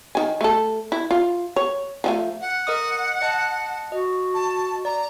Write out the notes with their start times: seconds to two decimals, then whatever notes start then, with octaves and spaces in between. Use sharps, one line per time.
0.15 D#3 G#5
0.41 A3 A4
0.92 E4
1.11 F4
1.56 C#5
2.04 F3 F#3 A3
2.41 F#5
2.67 A#4 D#5 D#6
3.22 D#5 A5 F#6
3.92 F#4 D#5
4.34 A5
4.85 D5 A#5